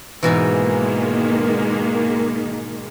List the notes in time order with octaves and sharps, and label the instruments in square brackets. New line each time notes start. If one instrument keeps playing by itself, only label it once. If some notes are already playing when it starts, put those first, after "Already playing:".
[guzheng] G#2 B2 E3 [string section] D#3 G#3 A#3